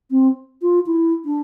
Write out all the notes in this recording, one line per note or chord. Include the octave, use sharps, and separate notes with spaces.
C4
F4
E4
D4